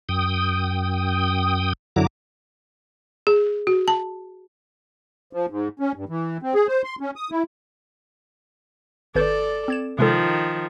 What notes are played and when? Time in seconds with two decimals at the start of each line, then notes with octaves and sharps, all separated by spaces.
0.09 F#2 G5 D#6
1.96 F#2 D3 F#3 E4 A#5 D6
3.27 G#4
3.67 F#4
3.88 A5
5.33 F3
5.50 G#2
5.80 C#4
5.96 G2
6.09 E3
6.42 C4
6.54 G#4
6.68 C5
6.84 C6
7.01 C#4
7.16 D#6
7.31 E4
9.15 G#1 A4 B4 D5 G6
9.68 C4 G#6 E7
9.99 C3 D#3 F3 G#3 A4